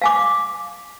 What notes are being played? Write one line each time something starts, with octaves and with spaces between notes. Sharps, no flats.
F5 G#5 D6